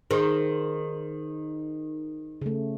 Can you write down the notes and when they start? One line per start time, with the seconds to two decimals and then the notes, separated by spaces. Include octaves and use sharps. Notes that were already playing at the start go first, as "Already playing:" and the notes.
0.11 D#3 G#4 C5
2.42 C#3 A3